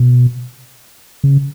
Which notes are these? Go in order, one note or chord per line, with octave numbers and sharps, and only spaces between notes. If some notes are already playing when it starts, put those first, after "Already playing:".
Already playing: B2
C#3